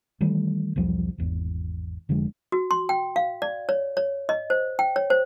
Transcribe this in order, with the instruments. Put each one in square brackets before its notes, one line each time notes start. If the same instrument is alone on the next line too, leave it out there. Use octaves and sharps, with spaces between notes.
[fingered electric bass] D#3 E3 G3 A3
B1 E2 F3 G3
G#1 E2
F1 D3 F3 G#3
[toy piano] F#4
C6
G5
F5
D5
C#5
C#5
D#5
C5
G5
C#5
C5